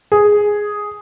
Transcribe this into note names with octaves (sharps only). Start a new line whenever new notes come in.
G#4